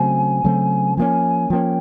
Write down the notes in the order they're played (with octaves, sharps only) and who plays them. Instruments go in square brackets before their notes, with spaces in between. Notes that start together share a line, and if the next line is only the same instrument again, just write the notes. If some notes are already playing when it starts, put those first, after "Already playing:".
Already playing: [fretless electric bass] C#3 F#3 A3 C4 [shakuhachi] G#5
[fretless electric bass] C#3 F#3 A3 C4
[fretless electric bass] F3 A#3 C#4 [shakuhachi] G#5
[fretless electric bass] F3 A#3 C#4 [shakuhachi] G5